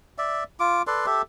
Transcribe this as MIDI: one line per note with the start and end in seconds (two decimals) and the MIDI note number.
0.18 0.44 74
0.18 0.44 76
0.60 0.82 65
0.60 0.82 86
0.87 1.06 69
0.87 1.06 71
0.87 1.06 74
0.87 1.06 84
1.06 1.22 67
1.06 1.22 69
1.06 1.22 76